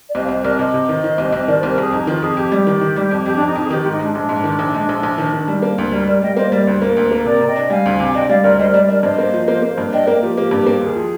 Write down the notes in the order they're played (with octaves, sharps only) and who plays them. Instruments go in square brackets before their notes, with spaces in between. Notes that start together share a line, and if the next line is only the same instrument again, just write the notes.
[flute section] D5
[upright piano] C2 [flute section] C5 D#5
[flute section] F5
[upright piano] C2 [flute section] C5 D#5
[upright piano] C2 [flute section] A#4 D5
[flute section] D5
[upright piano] C3 [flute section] C5 D#5
[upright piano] C3
D#3
D#3
C2
C2
[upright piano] D#3 [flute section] A#4 D5
[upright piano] C2 [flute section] C5
[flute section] A#4
[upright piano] C2 [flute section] G#4
[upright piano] F2 [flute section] D#4
[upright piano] D#3 [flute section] F4
[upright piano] F2 [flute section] G#4
[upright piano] F2 [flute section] G4
[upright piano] G3
D#3
D#3
G3
F2
[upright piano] F2 [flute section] G4
[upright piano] F2 [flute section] D4
[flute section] D#4
[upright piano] F2 [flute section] F4
[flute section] G#4
[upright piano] D#3 [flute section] G4
[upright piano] G#2 [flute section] G4
[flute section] D#4
[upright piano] G#3 [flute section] D4
[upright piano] A#1 [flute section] D4
[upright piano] G#2
D#3
A#1
G#3
A#1
A#1
D#3
D#3
G3
A#3
D2
[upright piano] G3 [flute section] A#4
[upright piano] G3 [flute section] A#4 D5
[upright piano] G3 [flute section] D#5 G5
[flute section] F5
[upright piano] A#3 [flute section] C5 D#5
[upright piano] G3 [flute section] A#4 D5
[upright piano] D2 [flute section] C5
[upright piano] A#3 [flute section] A#4
[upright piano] D2
A#3
[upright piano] C3 [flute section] A#4 D5
[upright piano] C3
[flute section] D#5 G5
[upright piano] D4
[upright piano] G3 [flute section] F5 G#5
[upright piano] D2
C3
[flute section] G#5
[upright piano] D4 [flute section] D#5 G5
[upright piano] G3 [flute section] D5 F5
[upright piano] D2 [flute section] A#4 D5
[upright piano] G3 [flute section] C5 D#5
[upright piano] G3 [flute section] A#4 D5
[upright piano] D4 [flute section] A#4 D5 D#5
[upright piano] G2 [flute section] C5 D#5
[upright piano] A#3
F3
A#3
A#3
G2
[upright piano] D4 [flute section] D#5 G5
[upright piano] A#3 [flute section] A#4
[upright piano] F3 [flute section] G4
[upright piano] A#3 [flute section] G4
[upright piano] G2
A#3
[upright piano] D#2 [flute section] G#4
[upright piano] F3